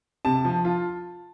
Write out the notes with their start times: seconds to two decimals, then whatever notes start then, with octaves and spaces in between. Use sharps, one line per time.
0.25 C3 A5
0.45 F3
0.65 F4